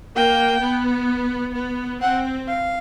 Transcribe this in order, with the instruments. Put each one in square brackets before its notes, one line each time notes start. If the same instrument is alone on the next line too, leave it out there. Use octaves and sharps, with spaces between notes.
[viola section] A#3 [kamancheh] G5
[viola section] B3
B3
[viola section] C4 [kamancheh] F#5
[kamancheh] F5